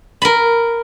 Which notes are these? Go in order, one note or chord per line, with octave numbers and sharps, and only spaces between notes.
A#4 B5